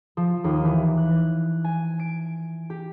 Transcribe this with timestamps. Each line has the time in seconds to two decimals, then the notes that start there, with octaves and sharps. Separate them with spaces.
0.17 F3
0.44 D#2
0.65 E3
0.97 F#6
1.64 G#5
1.99 D7
2.70 G4